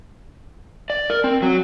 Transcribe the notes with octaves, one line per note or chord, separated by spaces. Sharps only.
D5
A#4
C4
F#3